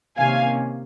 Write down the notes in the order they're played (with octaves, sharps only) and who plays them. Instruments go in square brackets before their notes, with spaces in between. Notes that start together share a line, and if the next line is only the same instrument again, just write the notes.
[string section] C3 D#3 A#3 C#4 F5 G#5